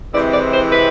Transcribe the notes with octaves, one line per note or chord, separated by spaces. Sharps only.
C3 E3 G#3 C4 E4 D5
D5
C5
B4